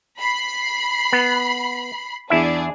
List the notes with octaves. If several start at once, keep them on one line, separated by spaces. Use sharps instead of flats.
B5 C7
B3
E2 D4 E4 G#4 E5